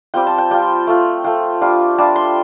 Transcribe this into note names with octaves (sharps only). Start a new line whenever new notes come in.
G3 C4 F4 G5
A5
G5
G3 C4 F4 G5
A3 F4
A3 F4 G5
G3 D4 F4
G3 D4 F4 A5
C6